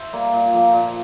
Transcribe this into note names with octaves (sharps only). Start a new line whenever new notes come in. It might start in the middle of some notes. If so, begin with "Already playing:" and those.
Already playing: C5 E5
G3 A#3
A#2
F3 A#3
A#2